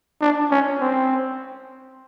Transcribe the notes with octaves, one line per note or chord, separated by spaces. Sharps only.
D4
C#4
C4